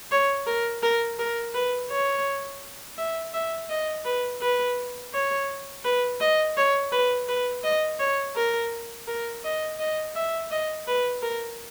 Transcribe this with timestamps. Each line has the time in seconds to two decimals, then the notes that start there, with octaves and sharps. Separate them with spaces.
0.12 C#5
0.47 A#4
0.83 A#4
1.19 A#4
1.54 B4
1.91 C#5
2.98 E5
3.34 E5
3.69 D#5
4.05 B4
4.41 B4
5.14 C#5
5.85 B4
6.21 D#5
6.57 C#5
6.92 B4
7.28 B4
7.64 D#5
8.00 C#5
8.36 A#4
9.07 A#4
9.44 D#5
9.79 D#5
10.15 E5
10.51 D#5
10.87 B4
11.22 A#4